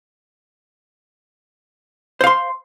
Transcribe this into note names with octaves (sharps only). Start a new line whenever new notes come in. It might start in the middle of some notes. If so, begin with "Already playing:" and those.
C5 F5 C6